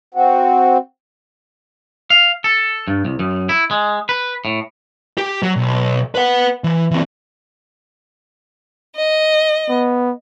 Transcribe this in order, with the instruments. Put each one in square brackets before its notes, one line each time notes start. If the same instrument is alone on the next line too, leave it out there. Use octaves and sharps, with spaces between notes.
[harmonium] C4 F#4
[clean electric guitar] F5
A4
G2
C2
F#2
E4
G#3
B4
A2
[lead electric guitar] G4
F#3
B1
B4 F#5
E3
E3 C4
[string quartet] D#5
[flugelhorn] B3